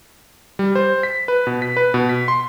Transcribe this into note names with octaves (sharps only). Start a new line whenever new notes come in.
G3
C5
B6
B4
B2
B6
B4
B2
B6
C6